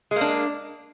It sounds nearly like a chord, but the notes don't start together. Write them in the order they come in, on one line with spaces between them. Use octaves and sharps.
G#3 A#3 D4